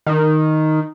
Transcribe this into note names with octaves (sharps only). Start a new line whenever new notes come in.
D#3